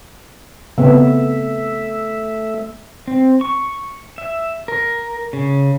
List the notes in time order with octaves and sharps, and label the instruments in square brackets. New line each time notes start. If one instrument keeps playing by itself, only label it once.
[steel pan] C#3 B3 C4 [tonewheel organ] A3 E5
[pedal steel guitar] C4
C#6
E5
A#4
C#3